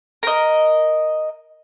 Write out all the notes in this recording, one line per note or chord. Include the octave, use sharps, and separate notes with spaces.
A#4 D#5